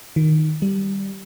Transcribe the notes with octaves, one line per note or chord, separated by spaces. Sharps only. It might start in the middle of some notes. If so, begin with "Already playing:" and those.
D#3
G3